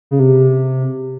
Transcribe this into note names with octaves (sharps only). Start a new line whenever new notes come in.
C#3
C3